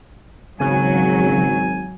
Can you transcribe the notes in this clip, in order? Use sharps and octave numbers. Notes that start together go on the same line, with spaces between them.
G#1 C#3 F#3 G#5